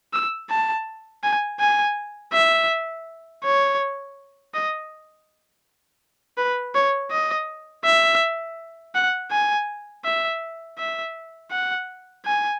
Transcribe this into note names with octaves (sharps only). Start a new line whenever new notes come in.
E6
A5
G#5
G#5
E5
C#5
D#5
B4
C#5
D#5
E5
F#5
G#5
E5
E5
F#5
G#5